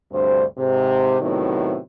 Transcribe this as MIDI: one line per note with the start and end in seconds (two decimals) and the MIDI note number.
0.12 0.43 38
0.12 0.43 43
0.12 0.43 48
0.12 0.43 72
0.58 1.16 44
0.58 1.16 48
1.21 1.77 45
1.21 1.77 48
1.21 1.77 51
1.21 1.77 54
1.21 1.77 59